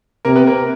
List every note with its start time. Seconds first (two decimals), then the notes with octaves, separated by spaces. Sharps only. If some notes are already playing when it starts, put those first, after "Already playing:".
0.25 C3 A#3 A#4
0.36 B3 B4
0.47 A#3 A#4